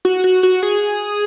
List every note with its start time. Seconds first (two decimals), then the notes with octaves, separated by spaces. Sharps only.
0.05 F#4
0.24 F#4
0.43 F#4
0.63 G#4